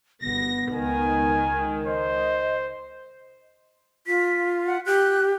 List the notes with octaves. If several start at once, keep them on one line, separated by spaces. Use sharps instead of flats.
G1 B3 A#6
C#2 D#3 G#5
C5 D#5
F4 B6
F#5
G4 F#6